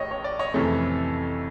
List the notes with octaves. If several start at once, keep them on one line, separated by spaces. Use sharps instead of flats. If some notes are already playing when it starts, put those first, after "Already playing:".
Already playing: A1 A2 C#5 D#5 G5
C#5
D5
C#5 D#5
F2 C3 E3 A3 C#4